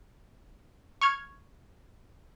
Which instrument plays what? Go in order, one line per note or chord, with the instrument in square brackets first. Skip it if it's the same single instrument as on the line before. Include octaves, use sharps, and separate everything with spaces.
[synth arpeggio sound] C#6 F6 G#6